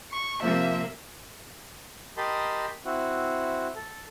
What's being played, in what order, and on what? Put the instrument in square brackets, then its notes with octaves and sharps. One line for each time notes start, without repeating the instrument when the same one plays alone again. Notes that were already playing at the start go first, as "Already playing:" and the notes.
[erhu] C#6
[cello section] C3 A#3 [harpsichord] F3 [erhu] E5
[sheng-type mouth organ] G4 A#4 D#5 A5 B5 C6
C4 E4 F#4
A4